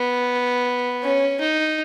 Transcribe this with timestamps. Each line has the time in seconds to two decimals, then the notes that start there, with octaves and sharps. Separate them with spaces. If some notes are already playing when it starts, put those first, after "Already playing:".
Already playing: B3
1.03 C#4
1.40 D#4